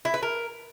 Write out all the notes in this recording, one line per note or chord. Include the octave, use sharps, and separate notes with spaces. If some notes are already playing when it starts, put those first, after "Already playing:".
E4
B4
A#4